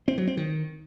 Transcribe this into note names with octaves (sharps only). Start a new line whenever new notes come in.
C4
F#3
C4
D#3